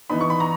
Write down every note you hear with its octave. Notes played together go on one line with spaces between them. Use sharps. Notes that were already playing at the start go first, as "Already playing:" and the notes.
E3 B3 D#4 B5
C#6
B5
A#5